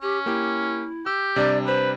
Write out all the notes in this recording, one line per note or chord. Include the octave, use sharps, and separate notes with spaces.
C#4 G4
A#3 E4 G4
G4 E6
C3 G3 D4 D5
B4 C5